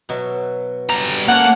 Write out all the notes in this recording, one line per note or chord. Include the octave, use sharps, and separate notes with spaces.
B2 F#3 E5
G3 A#5
A3 A#3 C#4 D5 F#5